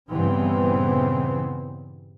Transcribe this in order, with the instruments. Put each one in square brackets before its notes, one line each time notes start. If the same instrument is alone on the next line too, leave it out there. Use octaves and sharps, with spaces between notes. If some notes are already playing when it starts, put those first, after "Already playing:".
[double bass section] G2 A#2 C#3 E3 B3 C4